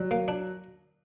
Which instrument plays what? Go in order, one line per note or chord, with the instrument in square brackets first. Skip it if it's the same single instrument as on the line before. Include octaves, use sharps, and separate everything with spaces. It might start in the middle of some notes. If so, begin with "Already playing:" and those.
Already playing: [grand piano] F#3 [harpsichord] G3
[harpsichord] A#3
D4